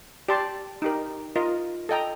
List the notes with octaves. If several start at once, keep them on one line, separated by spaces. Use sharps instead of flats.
G4 D5 A5 C6
D#4 G4 A#4
F4 A#4 D#5
A4 D#5 G5 A#5